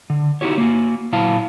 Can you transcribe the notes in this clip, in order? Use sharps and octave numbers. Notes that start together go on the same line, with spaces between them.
D3
D#4 E4 F#4 G4 C#5
A#3 F#4
A#2 F#3 E4 F5 A5